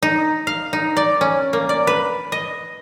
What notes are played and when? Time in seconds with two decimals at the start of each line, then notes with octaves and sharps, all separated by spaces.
0.03 D#4
0.47 F5
0.73 D#4
0.97 D5
1.21 C#4
1.53 A#3
1.69 D5
1.87 B4
2.32 D#5